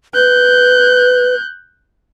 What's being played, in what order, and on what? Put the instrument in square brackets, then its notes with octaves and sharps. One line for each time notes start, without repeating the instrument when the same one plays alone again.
[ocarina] B4 [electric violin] F#6 G6